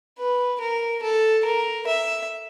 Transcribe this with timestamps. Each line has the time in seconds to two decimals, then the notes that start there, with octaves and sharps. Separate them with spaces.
0.19 B4
0.61 A#4
1.03 A4
1.45 A#4
1.87 E5